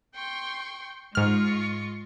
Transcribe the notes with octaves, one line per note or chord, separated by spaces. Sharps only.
G5 C6 C#6
G#2 G#3 F4 C#6 F6